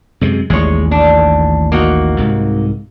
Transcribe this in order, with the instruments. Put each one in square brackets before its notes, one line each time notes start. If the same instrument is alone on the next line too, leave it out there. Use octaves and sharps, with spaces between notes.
[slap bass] F#2 C3 G#3
[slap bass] A1 D#2 [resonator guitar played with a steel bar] G#3 C#5
[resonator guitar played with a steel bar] D4
A#3 D#4 F#4
[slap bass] C2 G#2